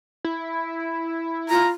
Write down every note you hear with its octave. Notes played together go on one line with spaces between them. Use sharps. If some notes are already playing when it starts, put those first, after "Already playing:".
E4
F4 A#5